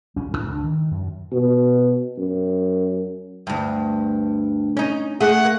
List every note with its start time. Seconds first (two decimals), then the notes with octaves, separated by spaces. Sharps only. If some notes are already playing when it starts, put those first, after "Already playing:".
0.16 A#1 G3 C#4
0.31 E1 A1 G#2
0.48 C#2 A3 D4
0.64 D#3
0.91 F#2
1.32 B2
2.18 F#2
3.47 D2 G2
4.77 C#4 D#4
5.21 A3 G#4 F#5
5.45 A#3